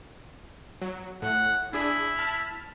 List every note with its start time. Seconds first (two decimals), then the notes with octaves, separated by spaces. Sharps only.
0.82 F#3
1.22 A2 F#5
1.73 D4 E4 G#4
2.16 A5 F6